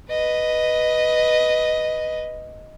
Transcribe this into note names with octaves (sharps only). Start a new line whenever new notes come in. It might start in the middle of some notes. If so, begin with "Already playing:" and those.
B4 D#5